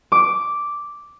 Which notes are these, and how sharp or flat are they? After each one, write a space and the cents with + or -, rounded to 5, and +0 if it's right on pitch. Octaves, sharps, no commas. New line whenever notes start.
D6 -5